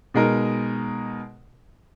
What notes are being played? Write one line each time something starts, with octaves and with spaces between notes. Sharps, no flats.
B2 G#3 D#4 A#4